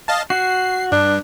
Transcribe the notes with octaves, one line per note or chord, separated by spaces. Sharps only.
D#5 F5 A5
F#4 C7
G2 D4